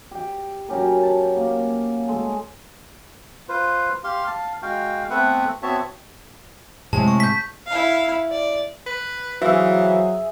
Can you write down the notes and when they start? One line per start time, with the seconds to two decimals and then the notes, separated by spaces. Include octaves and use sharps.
0.11 G4 G5
0.69 F#3 C#4 G4 A#4
1.03 A5
1.36 A#3
2.08 G#3 A3
3.49 F4 B4 C5
4.04 G4 F5 C6
4.27 F5 A5
4.62 G#3 F#4 F5 G5
5.10 A3 B3 C4 B4 E5 F#5
5.63 B3 C4 F#4 C#5 E5 A5
6.93 A2 C3 G#3 A5
7.08 C#6
7.20 G6 B6
7.67 E4 F5
8.32 D5
8.86 B4
9.42 E3 F#3 F#4 G#4 C5 E5 F5